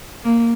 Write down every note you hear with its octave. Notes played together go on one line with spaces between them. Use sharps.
A#3